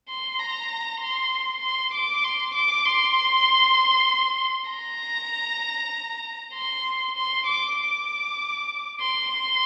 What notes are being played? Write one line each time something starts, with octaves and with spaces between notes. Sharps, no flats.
C6
A#5
C6
C6
D6
C6
D6
C6
A#5
C6
C6
D6
D6
C6
C6